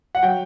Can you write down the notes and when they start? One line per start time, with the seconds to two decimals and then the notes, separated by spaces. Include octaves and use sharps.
0.15 F#5
0.23 F#3 G5